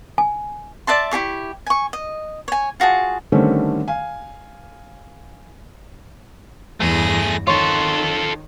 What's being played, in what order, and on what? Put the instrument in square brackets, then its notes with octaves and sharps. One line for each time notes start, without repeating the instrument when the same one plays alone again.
[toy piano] G#5
[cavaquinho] D5 E5 A5 C6
E4 G4 G#4 C#6
G#5 C#6
D#5
C#5 G#5
F4 F#4 G#4 A5
[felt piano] D3 D#3 G3 A3 C4 C#4
F5 G#5
[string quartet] E2 G2 A#6 [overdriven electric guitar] A3 G#4
[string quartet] D#3 [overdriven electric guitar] F4 A4 [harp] C#5 C6